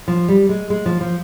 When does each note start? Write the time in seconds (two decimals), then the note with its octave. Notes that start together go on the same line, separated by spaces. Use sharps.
0.08 F3
0.29 G3
0.49 G#3
0.70 G#3
0.86 F3
1.01 F3